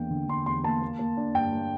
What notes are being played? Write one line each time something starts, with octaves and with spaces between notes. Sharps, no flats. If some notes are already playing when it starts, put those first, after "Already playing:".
Already playing: E2 A#3 D4 G5
D3
D3 C6
E2 C6
A#3 A5
A#3
A#3
D4
G2 G5
A#3